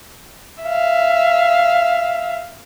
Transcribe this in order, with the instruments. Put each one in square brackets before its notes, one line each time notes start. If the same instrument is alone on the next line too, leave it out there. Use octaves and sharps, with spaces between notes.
[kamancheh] E5 F5